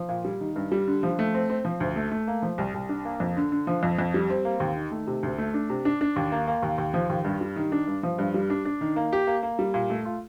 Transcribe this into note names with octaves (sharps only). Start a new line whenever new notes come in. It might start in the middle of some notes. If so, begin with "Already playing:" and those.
Already playing: F3
A#2
G3
D#3
G2
G3
D3
F3
A3
C4
C4
F3
D2
A3
A3
A#3
F3
C2
C2
D4
A#3
F2
D3
D3
F3
F2
F2
G3
C4
A#3
D#2
D#3
A3
C3
D2
A3
D4
C3
D4
D4
D#2
A#3
A#3
D#2
D#2
F3
D#2
G2
G3
D#3
D4
G2
F3
G2
G3
D4
D4
D#3
A#3
G4
A#3
A#3
G3
A#2
A3
F4